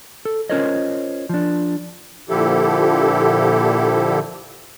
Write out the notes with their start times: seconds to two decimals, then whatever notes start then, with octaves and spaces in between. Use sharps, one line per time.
0.25 A4
0.50 C#4 F4 A#4 C5 C#5 D#5
1.29 F3 D4
2.29 A#2 D3 F3 E4 G4 A4